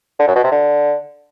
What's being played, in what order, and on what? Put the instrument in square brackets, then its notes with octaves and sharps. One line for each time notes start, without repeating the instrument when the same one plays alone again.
[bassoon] D3
F#2
B2
C3
D3